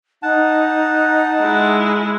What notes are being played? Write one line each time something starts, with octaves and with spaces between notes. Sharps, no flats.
D#4 F#5 A5
G#3 E4